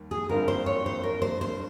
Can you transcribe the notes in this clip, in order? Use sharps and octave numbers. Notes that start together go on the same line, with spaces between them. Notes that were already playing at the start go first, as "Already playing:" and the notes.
Already playing: D#2 G3
G#4
G1 G2 G3 C4 F4 A#4
C5
C#5
C5
A#4
C5
C5